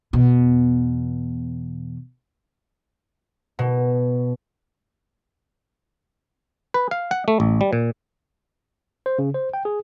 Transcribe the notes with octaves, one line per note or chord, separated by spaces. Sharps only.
E2 B2
B2
B4
F5
F#5
A3
A1
G3
A#2
C5
C#3
C5
G5
G#4